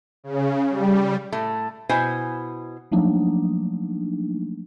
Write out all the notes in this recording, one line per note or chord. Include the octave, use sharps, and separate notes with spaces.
C#3
G3
A2 A3
B2 E4 C5 G#5
F3 F#3 A3 A#3 D4 D#4